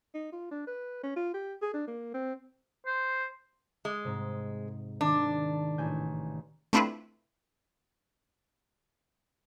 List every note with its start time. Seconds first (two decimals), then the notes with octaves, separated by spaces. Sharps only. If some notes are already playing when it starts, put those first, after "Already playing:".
0.14 D#4
0.32 F4
0.51 D4
0.67 B4
1.03 C#4
1.16 F4
1.34 G4
1.62 G#4
1.74 D4
1.87 A#3
2.14 C4
2.86 C5
3.85 G#3
4.04 G#2 C3
5.01 D#3 D4
5.78 A1 G#5 G6
6.73 A3 C4 D4 E4 F4 B4